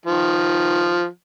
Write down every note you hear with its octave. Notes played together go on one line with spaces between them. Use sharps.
D#3 F3